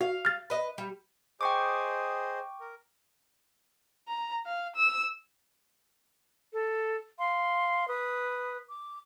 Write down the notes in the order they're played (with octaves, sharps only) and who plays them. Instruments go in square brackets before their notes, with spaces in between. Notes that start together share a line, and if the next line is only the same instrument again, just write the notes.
[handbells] F#4 [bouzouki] F5
[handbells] F6 A6
[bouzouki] B4 D#5
G3
[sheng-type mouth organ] G#4 C5 D#5 [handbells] G5 C#6 D6
[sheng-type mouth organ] A#4
[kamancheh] A#5
F5
E6
[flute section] A4
F5 C6
B4 D#6
D6